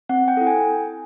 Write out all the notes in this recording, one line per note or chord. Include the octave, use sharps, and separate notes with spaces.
C4 F#5
G5
E4 A4
G#5